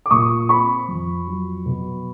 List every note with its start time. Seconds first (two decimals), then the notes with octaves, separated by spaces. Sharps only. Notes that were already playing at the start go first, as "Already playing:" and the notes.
0.06 D6
0.11 A#2 C#6 D#6
0.49 C4 B5 C#6
0.88 F2
1.27 F#3
1.66 B2